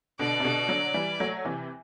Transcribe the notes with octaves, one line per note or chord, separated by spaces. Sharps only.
B2 D3 D5
C3
B2 D3
D3 F#3
E3 G3
F#3 A3
C3 E3